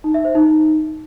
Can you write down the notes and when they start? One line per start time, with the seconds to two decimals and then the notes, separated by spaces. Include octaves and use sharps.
0.04 D#4
0.14 E5
0.25 C5
0.35 D#4